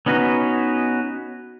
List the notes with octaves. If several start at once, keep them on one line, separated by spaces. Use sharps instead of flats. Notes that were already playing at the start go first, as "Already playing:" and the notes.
B3 C#4 D#4 F#4 B4